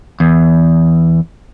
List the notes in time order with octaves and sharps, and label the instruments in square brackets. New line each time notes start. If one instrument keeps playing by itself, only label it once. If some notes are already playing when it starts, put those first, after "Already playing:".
[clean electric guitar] E2